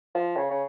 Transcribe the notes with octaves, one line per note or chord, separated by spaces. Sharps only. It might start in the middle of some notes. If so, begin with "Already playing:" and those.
F3
C#3
C#3